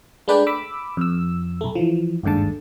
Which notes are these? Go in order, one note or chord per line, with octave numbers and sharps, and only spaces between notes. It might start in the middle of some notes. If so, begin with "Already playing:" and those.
G#3 A3 D4 B4 D5 G5
B5 D6 E6
F2 E6
B1 A3
E3 F3
G1 D#2 G#2 D3 A5